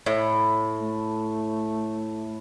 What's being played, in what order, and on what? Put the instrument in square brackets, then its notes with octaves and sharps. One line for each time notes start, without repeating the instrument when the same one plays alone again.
[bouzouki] A2
[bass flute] A3